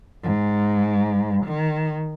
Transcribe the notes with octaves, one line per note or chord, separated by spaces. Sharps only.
G#2
D#3